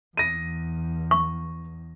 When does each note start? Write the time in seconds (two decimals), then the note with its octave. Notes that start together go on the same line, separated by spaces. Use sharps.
0.17 E2 A#6 D#7
1.11 C#6